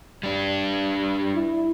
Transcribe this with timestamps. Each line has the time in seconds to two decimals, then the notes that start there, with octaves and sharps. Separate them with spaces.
0.23 G3 D4
1.34 E4